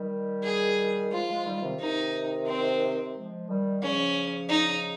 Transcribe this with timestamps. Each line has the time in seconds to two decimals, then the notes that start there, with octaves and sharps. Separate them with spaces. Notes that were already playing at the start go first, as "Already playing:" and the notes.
Already playing: D#3 G3
0.43 G#4
1.11 F3 G#3 F4
1.28 F3 G#3
1.45 D#3 G3
1.62 C3 D#3
1.79 C3 D#3 D#4
2.46 C4
3.14 F3 G#3
3.48 D#3 G3
3.82 C#3 F3 C#4
4.49 D#4